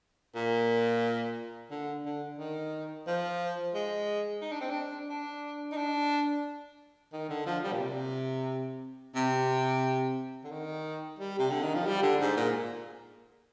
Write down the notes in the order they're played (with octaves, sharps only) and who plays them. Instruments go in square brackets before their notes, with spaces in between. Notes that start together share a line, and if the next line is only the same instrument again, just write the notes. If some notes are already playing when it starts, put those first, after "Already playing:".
[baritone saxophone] A#2
D3
D3
D#3
F3
G#3
D#4
D4
C4
D4
D4
D#4
D4
D#3
D3
F3
G3
A#2
C3
C3
D3
D#3
G3
C3
D3
D#3
F3
G3
D3
G#2
A#2